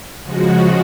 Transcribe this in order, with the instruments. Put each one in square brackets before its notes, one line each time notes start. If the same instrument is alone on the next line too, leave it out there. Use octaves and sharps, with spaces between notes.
[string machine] C#3 F3 G#3 F#4